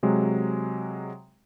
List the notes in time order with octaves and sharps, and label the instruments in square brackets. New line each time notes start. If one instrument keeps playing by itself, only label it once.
[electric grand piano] C3 F#3 G#3